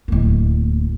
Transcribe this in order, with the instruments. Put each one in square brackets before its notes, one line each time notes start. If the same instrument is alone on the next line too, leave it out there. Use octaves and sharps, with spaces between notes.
[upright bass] D1 A#3